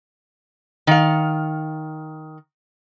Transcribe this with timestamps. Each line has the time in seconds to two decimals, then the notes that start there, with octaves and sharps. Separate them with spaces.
0.87 D#3 F5